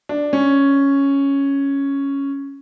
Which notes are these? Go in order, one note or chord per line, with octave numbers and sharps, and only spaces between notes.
D4
C#4